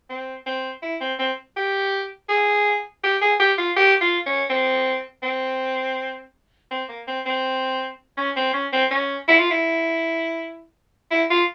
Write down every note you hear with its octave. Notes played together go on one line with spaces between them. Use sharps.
C4
C4
E4
C4
C4
G4
G#4
G4
G#4
G4
F4
G4
F4
C#4
C4
C4
C4
A#3
C4
C4
C#4
C4
C#4
C4
C#4
E4
F4
E4
E4
F4